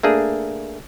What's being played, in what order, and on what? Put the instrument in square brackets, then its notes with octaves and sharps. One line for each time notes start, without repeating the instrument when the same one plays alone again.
[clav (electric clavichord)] A3 A#3 D4 G#4